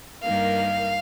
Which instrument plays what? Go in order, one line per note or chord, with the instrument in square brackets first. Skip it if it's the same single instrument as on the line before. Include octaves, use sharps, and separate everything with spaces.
[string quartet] G2 D#3 A#3 F5